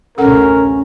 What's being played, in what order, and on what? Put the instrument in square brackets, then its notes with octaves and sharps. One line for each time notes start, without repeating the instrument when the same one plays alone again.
[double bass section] A1 D2 C3 [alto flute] C#4 [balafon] A4 F#5 [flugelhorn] A#4